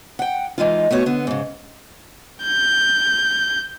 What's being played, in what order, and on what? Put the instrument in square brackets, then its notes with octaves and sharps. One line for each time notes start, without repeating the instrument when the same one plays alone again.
[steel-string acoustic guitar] F#5 G5
E3 G#3 D#4 F4
A3 B3 F#4 C#5
D3 B3
G#2 C#3
[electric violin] G6